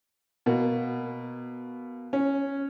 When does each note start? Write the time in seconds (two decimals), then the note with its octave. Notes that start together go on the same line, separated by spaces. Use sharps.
0.46 B2 A#3
2.13 C#4